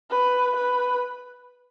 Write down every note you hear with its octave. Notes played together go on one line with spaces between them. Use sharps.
B4
B4